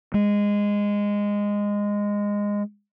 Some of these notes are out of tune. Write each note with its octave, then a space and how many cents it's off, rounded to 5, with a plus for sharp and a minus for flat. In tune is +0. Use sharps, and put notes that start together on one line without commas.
G#3 -15